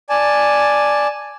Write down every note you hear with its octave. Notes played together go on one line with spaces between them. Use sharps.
D5 G#5 A5